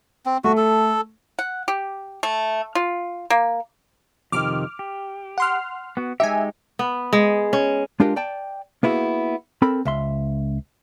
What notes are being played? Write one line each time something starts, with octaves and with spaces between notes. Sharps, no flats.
C4
A3 F#4
A4
F#5
G4
A3
F4
A#3
F2 C3 D#3 D6 F6
G4
F#5 C6 F6
B3 F#4
G#3 D#4 G4 E5 G#5
B3
G#3
C#4
G#3 D4 F4 G4 A#4
D5 G5 A5
A#3 B3 E4 F#4 G#4
C4 A4 A#4 B5
C#2 E5 C6